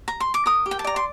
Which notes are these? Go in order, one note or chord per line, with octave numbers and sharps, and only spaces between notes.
A#5
C6
D6
A#4 D#6
G4
G5
A5
D5 A#5
C6